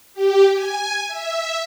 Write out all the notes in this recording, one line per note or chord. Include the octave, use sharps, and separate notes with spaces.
G4
G#5
E5